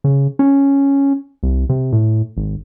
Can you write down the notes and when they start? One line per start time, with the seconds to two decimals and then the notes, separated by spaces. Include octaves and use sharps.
0.04 C#3
0.39 C#4
1.43 C2
1.69 C3
1.92 A2
2.37 G#1